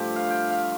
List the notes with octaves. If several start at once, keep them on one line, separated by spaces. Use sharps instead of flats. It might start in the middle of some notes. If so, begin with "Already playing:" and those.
Already playing: G2 F3 A3 F4 G4
F5
G5
F5